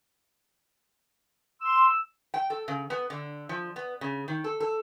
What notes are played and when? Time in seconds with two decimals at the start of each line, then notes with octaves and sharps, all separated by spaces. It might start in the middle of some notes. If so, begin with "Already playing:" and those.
1.61 C6 E6
2.34 G5
2.50 A4
2.68 C#3
2.90 B3
3.10 D3
3.49 F3
3.76 B3
4.01 C#3
4.28 D#3
4.44 A4
4.60 A4